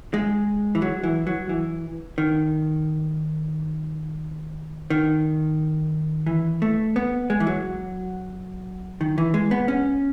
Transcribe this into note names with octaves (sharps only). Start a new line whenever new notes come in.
G#3
E3
F#3
E3
F#3
E3
D#3
D#3
E3
A3
B3
G#3
E3
F#3
D#3
E3
G#3
B3
C#4